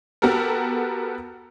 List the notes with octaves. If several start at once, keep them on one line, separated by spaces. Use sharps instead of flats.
B3 F#4 G4 A4 A#4